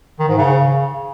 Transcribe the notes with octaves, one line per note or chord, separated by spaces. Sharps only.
D#3
G#2
C#3